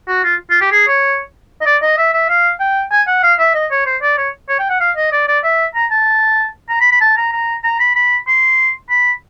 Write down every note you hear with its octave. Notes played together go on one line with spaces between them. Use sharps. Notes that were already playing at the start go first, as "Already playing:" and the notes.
F#4
F4
F4
G4
G#4
C#5
D#5
D5
D#5
E5
E5
F5
G5
G#5
F#5
F5
E5
D#5
C#5
C5
D5
C#5
C#5
G5
F#5
F5
D#5
D5
D5
E5
A#5
A5
A#5
B5
B5
A5
A#5
A#5
A#5
B5
B5
C6
B5